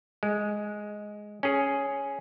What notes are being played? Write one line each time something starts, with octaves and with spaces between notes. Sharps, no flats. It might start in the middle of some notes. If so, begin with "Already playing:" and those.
G#3
C#4 G#4